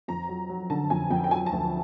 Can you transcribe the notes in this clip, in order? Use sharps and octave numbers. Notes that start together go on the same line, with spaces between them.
F2 A#5
F#3
F#3
D3 A5
F2 G#5
F2 G5
G5
F#3 G#5
A5
D2